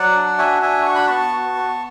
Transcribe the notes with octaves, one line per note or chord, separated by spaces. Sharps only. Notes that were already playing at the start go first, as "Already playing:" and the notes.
Already playing: F#3 D5 F#5
D4
F#4 E5 G#5
D4 E5 G#5
F#4 C#6
B5
B3 A5 C#6
F#4
B3